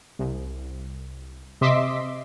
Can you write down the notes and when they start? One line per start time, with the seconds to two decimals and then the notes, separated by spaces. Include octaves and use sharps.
0.19 C2
1.61 C3 D#5 E5 C6 D6 B6